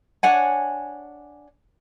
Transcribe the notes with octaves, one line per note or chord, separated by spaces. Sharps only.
D4 C#5 F#5 G#5